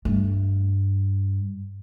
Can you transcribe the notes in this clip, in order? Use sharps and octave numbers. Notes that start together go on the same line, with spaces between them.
G2 A3